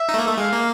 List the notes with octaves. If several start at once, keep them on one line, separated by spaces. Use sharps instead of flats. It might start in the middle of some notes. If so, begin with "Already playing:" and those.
Already playing: E5
D#4
A3
A#3
A3
G#3 F5
A#3